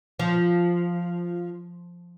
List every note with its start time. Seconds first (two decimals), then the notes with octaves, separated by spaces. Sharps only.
0.19 F3